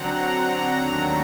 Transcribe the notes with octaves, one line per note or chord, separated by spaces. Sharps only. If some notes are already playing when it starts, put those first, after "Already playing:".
Already playing: D3 F#3 C4 F#5 A#5
A#5
D#2 D#3 F#3 A3 D4 A#5